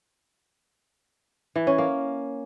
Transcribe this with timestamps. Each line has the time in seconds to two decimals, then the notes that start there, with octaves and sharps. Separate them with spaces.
1.55 E3
1.67 C#4
1.78 A#3